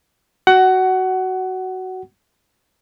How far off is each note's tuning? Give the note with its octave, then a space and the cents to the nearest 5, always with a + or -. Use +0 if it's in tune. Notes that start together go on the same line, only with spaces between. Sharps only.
F#4 +10 F#5 +20